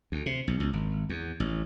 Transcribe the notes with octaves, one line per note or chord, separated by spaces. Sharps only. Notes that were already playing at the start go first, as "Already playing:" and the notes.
D2
C3
B1
C#2
G#1
E2
A1